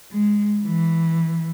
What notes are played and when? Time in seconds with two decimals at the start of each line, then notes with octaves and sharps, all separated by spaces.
0.12 G#3
0.64 E3